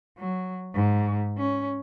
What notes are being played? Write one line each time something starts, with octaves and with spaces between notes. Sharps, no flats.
F#3
G#2
C#4